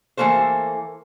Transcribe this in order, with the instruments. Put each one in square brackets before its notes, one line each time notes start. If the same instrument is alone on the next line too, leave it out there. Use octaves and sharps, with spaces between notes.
[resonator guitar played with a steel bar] E3 A3 A#3 A4 C5